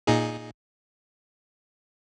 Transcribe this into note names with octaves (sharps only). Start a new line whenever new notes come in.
A#2 D#4 G#4